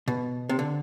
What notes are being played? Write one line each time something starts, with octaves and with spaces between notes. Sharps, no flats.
B2
C3
D3